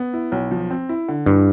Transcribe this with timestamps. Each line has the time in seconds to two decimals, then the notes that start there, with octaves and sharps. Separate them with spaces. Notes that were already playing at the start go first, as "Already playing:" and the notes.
Already playing: B3
0.13 E4
0.32 B1
0.51 F3
0.71 C4
0.89 E4
1.08 D3
1.26 G2 E3